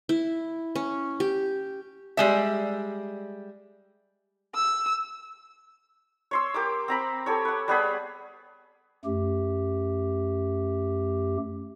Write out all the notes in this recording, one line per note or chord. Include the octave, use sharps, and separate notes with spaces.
E4
C#4
G4
G3 G#3 E5
E6
C#5 C6 E6
G4 A#4 D6
C4 A#5 B5
G4 A4 C#5
B4 F#5
G3 B3 G#4 B5
F#2 A3 G4